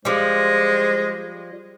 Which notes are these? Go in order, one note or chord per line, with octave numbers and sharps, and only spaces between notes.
F3 G3 G#3 C5